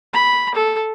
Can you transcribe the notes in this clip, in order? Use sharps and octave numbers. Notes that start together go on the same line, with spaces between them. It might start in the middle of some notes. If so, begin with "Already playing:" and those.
B5
A4